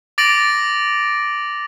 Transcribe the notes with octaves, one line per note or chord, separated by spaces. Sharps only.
D6 A6 A#6 D7 F#7